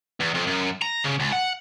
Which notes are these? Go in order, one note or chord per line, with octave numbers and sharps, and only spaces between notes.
E2
F2
F#2
A#5
C#3
C#2
F#5